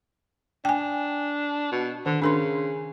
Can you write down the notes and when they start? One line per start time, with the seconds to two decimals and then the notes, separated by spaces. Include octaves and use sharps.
0.65 D4 G5 G#5
1.72 B2
2.06 D3 D#3
2.22 C#3 D4 A#4 C6